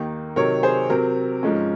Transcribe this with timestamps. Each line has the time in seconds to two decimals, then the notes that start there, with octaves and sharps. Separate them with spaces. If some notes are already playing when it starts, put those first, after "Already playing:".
Already playing: D#2 D#3 A#3 D#4
0.36 C3 D#3 F#3 A#4 C#5
0.63 G#4 C5
0.90 C3 F#3 C4 A#4
1.43 G#2 F3 G#3 C#4